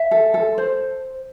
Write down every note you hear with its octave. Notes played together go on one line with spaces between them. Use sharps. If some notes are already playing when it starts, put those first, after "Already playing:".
Already playing: E5
A4
A4
C5